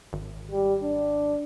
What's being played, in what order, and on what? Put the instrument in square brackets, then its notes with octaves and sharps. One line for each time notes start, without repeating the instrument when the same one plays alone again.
[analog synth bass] G#1
[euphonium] G3
D4